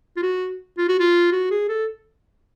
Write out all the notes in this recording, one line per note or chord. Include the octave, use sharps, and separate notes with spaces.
F4
F#4
F4
F#4
F4
F#4
G#4
A4